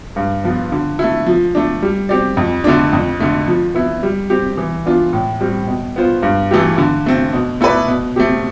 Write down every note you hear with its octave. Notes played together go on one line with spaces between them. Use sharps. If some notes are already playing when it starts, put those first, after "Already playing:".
G2
F3 B3 F4
D3
A3 E4
F3
A3 D4
G3
C4 G4 D5
F2
D3 A3 D4
F2
D3 A3
F3
B3 E4
G3
C4 G4
E3
B3 D4 F4
A2
G3 C4
B2
B3 F4 C5
G2
E3 A3 E4 G4
D3
A3 C4
B2
A3 E4 B4 D5
B2
A3 C4 G4